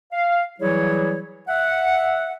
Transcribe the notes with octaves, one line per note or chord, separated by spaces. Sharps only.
F5
E3 F#3 G3 E4 G#4 C#5
E5 F#5